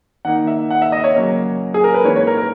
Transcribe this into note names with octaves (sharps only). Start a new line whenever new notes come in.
D#3 A#3 D#4 F#5
E5
F#5
E5
D#5
C#5
C#3 F#3 A#3 C#4
G#4
A#4
B4
G#2 E3 A#3 C#4 E4 C#5
C#5
A#4
A#4